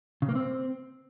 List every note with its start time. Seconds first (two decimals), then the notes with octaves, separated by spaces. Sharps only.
0.22 C#3
0.29 A#3
0.35 C4